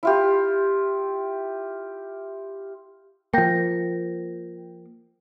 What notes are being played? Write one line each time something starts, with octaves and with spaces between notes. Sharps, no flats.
E4 F4 G4
F3 A#3 G5 G6 A#6